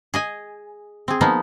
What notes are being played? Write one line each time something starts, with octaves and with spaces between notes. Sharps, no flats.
G#4 D#5 G#5
C4 G#4
F3 A#3 B3 D#4